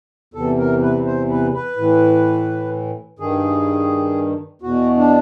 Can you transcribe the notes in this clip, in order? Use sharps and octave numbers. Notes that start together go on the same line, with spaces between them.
E2 C3 E3 A4
A#4
B4
C5
B4
B4
A2 E3
G2 D#3 G#4
E2 B2 F#4
D4